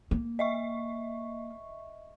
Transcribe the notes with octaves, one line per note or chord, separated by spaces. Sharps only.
A#3
D#5 E5 C#6